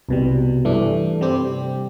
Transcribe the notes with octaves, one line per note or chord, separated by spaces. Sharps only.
C2 B2 G3
G2 E3 A3 D4
C3 G3 C4 G4